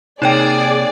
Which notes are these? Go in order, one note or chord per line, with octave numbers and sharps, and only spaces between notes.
C3 A#3 D#4 G#4 C#5 D5 G5